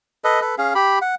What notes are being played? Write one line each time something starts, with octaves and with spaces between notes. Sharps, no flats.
A4 B4 D#5
A4 B4
C#4 G#4 F5
G4 B5
F#5